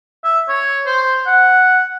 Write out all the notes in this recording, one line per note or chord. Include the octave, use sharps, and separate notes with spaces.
E5
C#5
C5
F#5